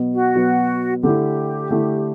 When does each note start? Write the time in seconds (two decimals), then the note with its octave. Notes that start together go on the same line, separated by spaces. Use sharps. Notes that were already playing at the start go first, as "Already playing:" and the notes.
Already playing: B2 F#3 B3
0.13 F#4
0.35 B2 F#3 B3
1.02 D3 A3 E4 G4
1.70 D3 A3 E4